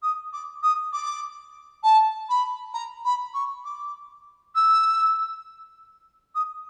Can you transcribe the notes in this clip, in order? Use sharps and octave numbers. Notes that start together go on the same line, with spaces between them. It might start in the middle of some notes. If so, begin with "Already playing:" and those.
D#6
D6
D#6
D6
A5
B5
A#5
B5
C#6
D6
E6
D#6